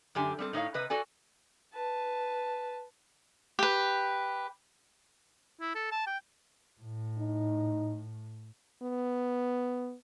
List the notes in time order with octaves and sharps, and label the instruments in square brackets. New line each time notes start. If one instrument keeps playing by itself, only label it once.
[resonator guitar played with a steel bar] F#2 D3 G4 G#5
G3 C4 A4
A2 D#4 C#5 F5
C3 B4 D#5
F#4 A4 D5 G#5
[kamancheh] B4 A5
[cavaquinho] G4 B4
[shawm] E4
A4
A5
G5
[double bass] A2
[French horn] D#4
[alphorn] B3